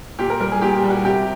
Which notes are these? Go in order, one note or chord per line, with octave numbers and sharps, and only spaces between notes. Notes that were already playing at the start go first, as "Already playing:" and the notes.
A#2 G4
A#4
G3 A#4
G#4
A#2 G4
G4
G3
F#4
C3 G4